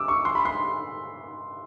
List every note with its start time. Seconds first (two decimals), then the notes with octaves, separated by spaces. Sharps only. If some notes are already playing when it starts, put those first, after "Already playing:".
Already playing: D6 E6
0.08 C#6
0.25 C6
0.35 B5
0.45 C6